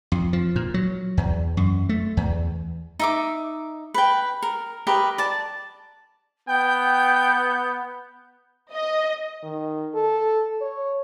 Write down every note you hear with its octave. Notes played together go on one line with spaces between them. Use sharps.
F2
F3
A#2
F#3
E2
F#2
A3
E2
D#4 E5 D6
B4 G5
A#4
G4 A#4 B4 D#5
D5 A5
B3 G5 G6
D#5
D#3
A4
C#5